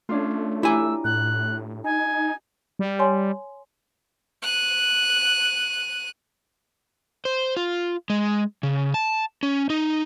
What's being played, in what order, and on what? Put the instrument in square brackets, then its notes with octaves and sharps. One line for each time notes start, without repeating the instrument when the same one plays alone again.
[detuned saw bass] A3 [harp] C#4 D4 F4
[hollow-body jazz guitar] E4 G#5 [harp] G4 A#5 D6 [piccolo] E6
[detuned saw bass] A2 [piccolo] F#6
[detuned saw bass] D#4 [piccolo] G#5
[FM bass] G3
[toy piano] C#5 G#5 C6
[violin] F#6 D#7
[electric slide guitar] C5
F4
G#3
C#3
A5
C#4
D#4